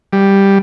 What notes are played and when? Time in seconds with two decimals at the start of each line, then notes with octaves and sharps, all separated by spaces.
0.13 G3